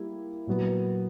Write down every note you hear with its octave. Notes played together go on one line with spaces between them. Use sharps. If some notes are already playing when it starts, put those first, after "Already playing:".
Already playing: G3 A#3 E4
A#2 F#3 B3